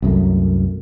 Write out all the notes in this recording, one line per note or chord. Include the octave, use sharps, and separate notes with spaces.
C2 F#2 A3